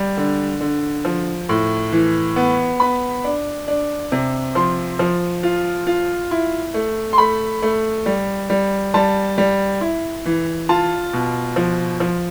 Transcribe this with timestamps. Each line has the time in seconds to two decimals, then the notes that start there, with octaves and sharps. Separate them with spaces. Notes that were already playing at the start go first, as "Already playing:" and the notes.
Already playing: G3
0.17 D3
0.61 D3
1.05 F3
1.49 A2
1.92 E3
2.36 B3
2.80 B3 B5
3.24 D4
3.68 D4
4.12 C3
4.55 F3 C6
4.99 F3
5.43 F4
5.87 F4
6.31 E4
6.74 A3
7.13 C6
7.18 A3 B5
7.62 A3
8.06 G3
8.50 G3
8.94 G3 A5
9.38 G3
9.81 E4
10.26 E3
10.69 F4 A5
11.13 B2
11.56 F3
12.00 F3